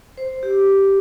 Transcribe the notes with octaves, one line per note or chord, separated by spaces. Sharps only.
C5
G4